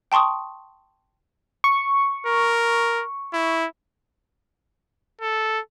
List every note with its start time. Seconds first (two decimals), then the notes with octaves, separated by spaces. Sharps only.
0.12 G5 A5 C6 C#6 D#6
1.64 C#6
2.27 A#4
3.34 E4
5.21 A4